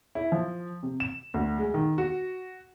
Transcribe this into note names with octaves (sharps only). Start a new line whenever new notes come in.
E4
F3
C3
E7
D2
G#3
D#3
F#4